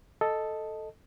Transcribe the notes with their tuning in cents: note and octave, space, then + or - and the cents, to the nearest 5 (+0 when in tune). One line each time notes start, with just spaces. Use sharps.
A4 +0 D#5 +0